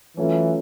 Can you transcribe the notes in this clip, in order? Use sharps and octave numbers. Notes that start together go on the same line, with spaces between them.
E3 F#3 A3 C#4 F4